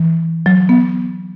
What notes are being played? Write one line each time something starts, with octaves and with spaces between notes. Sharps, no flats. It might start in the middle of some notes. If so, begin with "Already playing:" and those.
Already playing: E3
F#3
B3